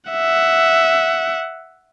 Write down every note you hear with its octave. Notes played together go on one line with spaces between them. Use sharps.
E5 F#5